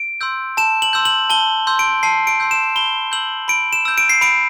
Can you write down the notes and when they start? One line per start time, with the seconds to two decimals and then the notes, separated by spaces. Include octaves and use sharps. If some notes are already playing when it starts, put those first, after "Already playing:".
Already playing: D7
0.21 C6 E6 G6
0.57 A5 E7
0.82 F#7
0.93 C6 E6 G6
1.05 F#7
1.30 A5 G7
1.67 C6 E6 G6
1.79 D7
2.03 A5 C7
2.27 D7
2.40 C6 E6 G6
2.51 E7
2.76 B5 G7
3.12 E6 G6 F#7
3.48 B5 D7
3.73 E7
3.85 E6 G6
3.98 D7
4.10 C7
4.21 B5 D7